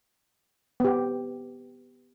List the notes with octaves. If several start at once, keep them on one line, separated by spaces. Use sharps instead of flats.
B3 G4